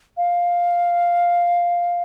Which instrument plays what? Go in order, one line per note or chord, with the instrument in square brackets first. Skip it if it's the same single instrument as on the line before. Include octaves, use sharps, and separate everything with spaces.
[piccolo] F5